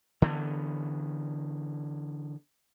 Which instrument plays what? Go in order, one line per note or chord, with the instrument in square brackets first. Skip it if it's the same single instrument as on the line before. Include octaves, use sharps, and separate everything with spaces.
[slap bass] D3 E3 A3 B3